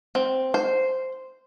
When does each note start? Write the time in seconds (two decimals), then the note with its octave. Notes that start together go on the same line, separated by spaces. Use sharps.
0.15 C4
0.54 C5